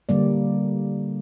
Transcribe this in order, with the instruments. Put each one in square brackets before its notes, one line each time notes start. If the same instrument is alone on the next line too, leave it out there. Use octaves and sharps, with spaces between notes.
[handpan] D3 G3 A#3 D5